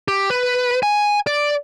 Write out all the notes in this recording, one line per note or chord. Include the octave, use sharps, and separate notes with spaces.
G4
B4
G#5
D5